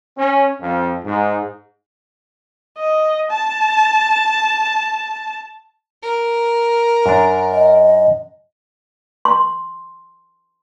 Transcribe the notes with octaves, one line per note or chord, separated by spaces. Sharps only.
C#4
F2
G#2
D#5
A5
A#4
F#2 D4
D#5
C6